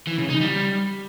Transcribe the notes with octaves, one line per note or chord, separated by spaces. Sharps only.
E3
C#3
D#4
G3